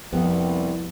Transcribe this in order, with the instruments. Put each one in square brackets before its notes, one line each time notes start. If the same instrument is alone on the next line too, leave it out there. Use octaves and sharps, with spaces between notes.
[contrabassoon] C2 [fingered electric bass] F2 [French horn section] G3 [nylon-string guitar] B3